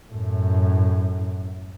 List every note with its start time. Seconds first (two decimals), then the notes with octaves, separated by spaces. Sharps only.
0.12 F#2 A2